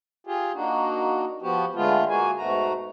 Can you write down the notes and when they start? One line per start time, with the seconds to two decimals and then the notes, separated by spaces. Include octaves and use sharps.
0.27 F4 G4 G#4
0.55 A#3 D4 D#4 F#4
1.42 F3 B3 F#4 G4
1.75 D3 G#3 A3 B3 F4
2.09 A#3 F#4 G#4 G#5
2.37 G#2 B2 A3 F#4 A#5